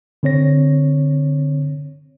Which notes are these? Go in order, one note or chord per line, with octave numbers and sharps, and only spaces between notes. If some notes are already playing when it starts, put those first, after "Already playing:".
D3 C4 C#5 A#6